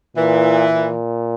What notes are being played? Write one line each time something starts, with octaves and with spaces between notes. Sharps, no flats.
A#2 E3
A#2